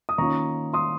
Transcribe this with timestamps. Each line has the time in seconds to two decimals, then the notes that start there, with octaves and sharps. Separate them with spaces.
0.09 D#6
0.18 D#3 A#3 C#4 F4 A#5 C#6
0.73 C6 D#6